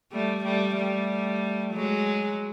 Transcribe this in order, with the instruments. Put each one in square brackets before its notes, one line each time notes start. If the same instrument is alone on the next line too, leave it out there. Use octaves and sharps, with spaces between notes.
[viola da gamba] G3 A3
G3 A3
G3 A3
F#3 G#3